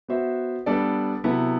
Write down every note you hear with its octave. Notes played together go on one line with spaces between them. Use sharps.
B3 F#4 C5 E5
G3 B3 D4 A4 D5
C3 F#3 B3 E4 A4